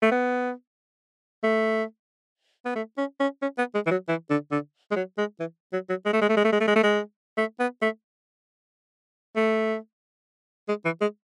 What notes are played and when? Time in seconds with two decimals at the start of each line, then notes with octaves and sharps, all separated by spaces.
0.03 A3
0.11 B3
1.44 A3
2.65 B3
2.76 A3
2.98 C#4
3.20 C#4
3.42 C#4
3.58 B3
3.75 G#3
3.87 E3
3.91 F#3
4.08 E3
4.30 D3
4.52 D3
4.92 G#3
4.96 F#3
5.18 G#3
5.40 E3
5.73 F#3
5.89 F#3
6.06 G#3
6.13 A3
6.22 G#3
6.29 A3
6.37 G#3
6.45 A3
6.53 G#3
6.61 A3
6.68 G#3
6.76 A3
6.83 G#3
7.38 A3
7.60 B3
7.82 A3
9.36 A3
10.68 G#3
10.85 E3
11.01 G#3